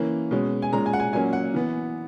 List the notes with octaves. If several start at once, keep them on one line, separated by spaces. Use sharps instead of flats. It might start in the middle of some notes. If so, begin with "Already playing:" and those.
Already playing: E3 A#3 C#4
B2 G#3 C#4
G#5
A#2 G#3 C#4 A#5
G#5
F#5
G#5
A#2 F#3 A#3 C#4 G#5
F#5
E3 B3